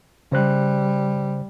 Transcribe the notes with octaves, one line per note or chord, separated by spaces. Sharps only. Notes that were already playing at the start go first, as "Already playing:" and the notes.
C#3 G3 C5 F#6